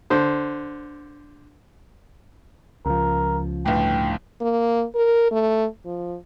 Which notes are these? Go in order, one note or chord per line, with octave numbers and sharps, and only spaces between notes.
D3 C5
C#2 F3 A#4
G1 A2 G5
A#3
A#4
A3
F3